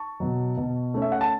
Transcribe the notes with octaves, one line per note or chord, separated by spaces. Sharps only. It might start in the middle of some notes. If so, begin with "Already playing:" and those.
Already playing: A5 C#6
B2 F#3
B2
A3 C#4
E5
F#5
A5